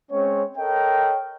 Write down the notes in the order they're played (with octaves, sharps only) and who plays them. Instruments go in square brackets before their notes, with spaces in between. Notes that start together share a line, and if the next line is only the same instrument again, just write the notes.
[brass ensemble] G#3 C4 C#4 C#5
A4 A#4 C#5 D#5 G5